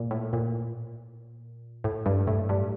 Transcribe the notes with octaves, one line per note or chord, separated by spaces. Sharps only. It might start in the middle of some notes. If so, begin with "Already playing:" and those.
Already playing: A#2
A2
A#2
A2
G2
A2
G2